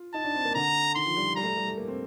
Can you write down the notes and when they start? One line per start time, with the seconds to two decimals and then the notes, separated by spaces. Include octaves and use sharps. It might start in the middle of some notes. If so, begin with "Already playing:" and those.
Already playing: F4
0.14 D#4 A5
0.24 D4
0.35 C4
0.45 A#3
0.55 D3 A#5
0.95 D#3 C6
1.06 F3
1.17 G3
1.26 F3
1.36 G3 A#5
1.43 A3
1.46 G3
1.57 G3
1.67 A3
1.77 A#3
1.88 C4